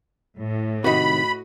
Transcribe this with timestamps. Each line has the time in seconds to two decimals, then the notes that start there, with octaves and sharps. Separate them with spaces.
0.39 A2
0.84 C3 D#3 F#4 D#5 B5